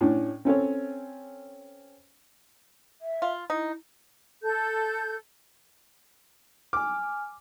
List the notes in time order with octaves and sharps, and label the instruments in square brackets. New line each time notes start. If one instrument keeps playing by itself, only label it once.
[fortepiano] A2 C#4 D4
C4 C#4 A4 C#5
[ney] E5
[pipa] F4
[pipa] D#4 [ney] E4
[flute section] A4 G6
[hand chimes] G#5 F6 [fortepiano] D6